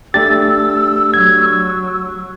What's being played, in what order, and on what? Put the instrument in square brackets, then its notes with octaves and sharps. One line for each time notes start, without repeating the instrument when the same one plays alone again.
[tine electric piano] A3 D4 G4 [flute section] E6 [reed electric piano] A6
[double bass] F#3 [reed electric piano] G#6